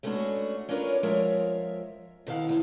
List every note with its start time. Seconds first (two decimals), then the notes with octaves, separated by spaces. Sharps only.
0.03 G#3 A3 B3 C#4 D4 F#4
0.69 C#4 D4 F4 A#4 B4 C#5
1.03 F3 G#3 A#4 C#5 E5
2.27 B2 D#3 E4 F5 F#5
2.49 E2 C3 B3